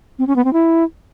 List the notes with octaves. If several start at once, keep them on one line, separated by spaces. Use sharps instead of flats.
C4
C#4
B3
C4
E4